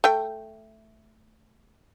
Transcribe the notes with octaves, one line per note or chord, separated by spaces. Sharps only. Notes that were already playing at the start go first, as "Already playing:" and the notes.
A3 G5